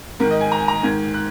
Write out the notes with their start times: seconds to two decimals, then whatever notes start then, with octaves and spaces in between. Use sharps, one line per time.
0.20 G#2 D#3 A#4
0.31 D#5
0.41 G#5
0.52 A#5
0.60 G#5
0.68 A#5
0.83 G#2 D#3 G#6
1.14 F#6